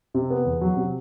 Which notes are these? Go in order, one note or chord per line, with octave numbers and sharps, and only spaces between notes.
C3
B3
E2
F#3
C3